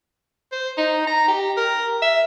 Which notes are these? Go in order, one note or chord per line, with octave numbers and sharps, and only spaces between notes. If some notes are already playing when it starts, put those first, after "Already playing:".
C5
D#4
A#5
G4
A#4
E5